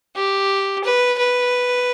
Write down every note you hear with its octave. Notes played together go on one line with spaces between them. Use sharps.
G4
B4
B4